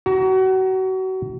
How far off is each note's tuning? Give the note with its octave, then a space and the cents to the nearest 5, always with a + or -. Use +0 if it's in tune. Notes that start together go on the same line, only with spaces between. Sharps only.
F#4 +30 A#5 +0